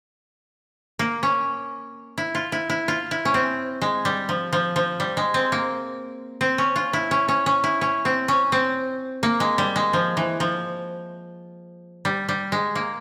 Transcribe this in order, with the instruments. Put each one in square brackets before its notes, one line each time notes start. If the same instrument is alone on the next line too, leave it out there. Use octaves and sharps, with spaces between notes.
[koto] A#3
C#4
E4
F4
E4
E4
F4
E4
C#4
C4
G#3
G3
F3
F3
F3
G3
G#3
C4
A#3
C4
C#4
F4
E4
C#4
C#4
C#4
E4
C#4
C4
C#4
C4
A#3
G#3
G3
G#3
F3
E3
F3
G3
G3
G#3
A#3